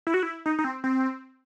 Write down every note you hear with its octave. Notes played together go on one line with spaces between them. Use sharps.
E4
F#4
E4
D#4
D#4
C4
C4